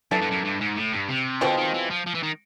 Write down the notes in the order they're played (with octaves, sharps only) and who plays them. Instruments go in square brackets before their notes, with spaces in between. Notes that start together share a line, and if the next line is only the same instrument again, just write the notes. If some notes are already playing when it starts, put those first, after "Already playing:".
[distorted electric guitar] F#2 [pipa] B3 E4 A4 D5
[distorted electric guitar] G2
F#2
G2
G#2
A2
G2
C3
[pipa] B2 G#3 C4 F4 [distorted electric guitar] D3
[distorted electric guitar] D#3
E3
F3
F3
E3
D#3